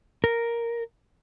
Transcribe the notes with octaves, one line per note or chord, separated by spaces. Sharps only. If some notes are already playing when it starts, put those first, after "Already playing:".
A#4